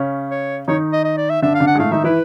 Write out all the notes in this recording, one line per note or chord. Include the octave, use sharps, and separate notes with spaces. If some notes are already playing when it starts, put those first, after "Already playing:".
Already playing: C#3 C#4
C#5
D#3 D#4 C#5
D#5
D#5
D5
E5
D3 D4 E5
F5
D3 D4
F#5
G#3
A2 A3 F5
D#3 D#4 E5
E3 E4 B4